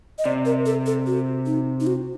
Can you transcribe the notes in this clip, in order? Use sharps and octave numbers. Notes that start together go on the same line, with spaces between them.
D#5
C3 D5
A#4
A4
A4
F#4
D#4
D#4
F#4